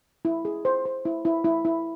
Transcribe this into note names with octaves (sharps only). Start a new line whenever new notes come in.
E4
G#4
C5
C5
E4
E4
E4
E4